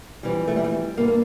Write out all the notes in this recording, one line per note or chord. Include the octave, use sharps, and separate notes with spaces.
F2 E3 G3
A3
G3
A3
G3
G2 D3 A#3
A#3